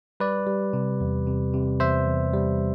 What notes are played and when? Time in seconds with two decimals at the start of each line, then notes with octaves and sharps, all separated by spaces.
0.20 G3 B4 D5
0.47 G3
0.73 C3
1.01 E2
1.27 C3
1.54 C3
1.80 E2 C5 E5
2.07 E2
2.33 G3